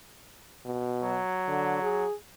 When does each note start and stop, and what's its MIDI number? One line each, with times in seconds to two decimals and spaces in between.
0.66 1.18 47
1.03 2.05 54
1.48 1.77 50
1.82 2.14 68